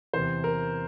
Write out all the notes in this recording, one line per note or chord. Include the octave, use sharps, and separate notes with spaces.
E2 C3 E3 C5
A#4